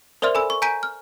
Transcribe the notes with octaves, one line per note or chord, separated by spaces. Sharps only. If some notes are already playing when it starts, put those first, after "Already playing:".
A#4 C5 D5 E5 C6 F6
A4 G#5 B5 E6
C#6
G#5 A#5 G6 B6 D7 D#7
F6